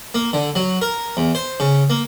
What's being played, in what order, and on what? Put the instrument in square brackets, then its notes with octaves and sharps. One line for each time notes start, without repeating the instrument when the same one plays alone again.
[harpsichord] A#3
D3
F#3
A#4
E2
C5
C#3
A#3